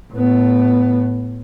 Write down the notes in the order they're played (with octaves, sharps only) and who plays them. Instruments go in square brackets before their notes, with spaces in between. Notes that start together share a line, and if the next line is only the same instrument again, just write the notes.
[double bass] A2 B3